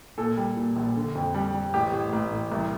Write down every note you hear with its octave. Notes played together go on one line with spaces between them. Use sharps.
A#2 A4
G3
A#2
A#1
D3
F2
G3
G3
A1 G4
A1
A1
A1
C2